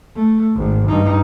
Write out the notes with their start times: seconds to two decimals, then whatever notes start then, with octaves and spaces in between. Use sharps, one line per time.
0.16 A3
0.56 G#1
0.88 G2 D#4